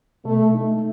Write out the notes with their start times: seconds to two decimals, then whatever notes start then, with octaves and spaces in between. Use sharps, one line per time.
0.25 B2 A3
0.55 A3 D#4